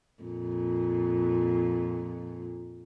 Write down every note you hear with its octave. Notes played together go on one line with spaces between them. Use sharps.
F2 A#2